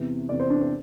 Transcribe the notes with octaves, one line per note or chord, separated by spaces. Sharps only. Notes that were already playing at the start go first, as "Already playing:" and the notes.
Already playing: E2 C3 E3
E2 C3 E3 D5
C5
D4
C4